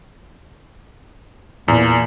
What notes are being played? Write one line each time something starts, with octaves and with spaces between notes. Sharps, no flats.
E2 A#2